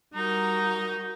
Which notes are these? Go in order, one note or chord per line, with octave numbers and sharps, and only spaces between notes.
G3 D#4 F#4 A#4 A#5